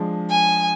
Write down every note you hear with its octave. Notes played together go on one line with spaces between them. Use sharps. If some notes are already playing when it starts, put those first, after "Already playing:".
Already playing: F3 G#3 D4
G#5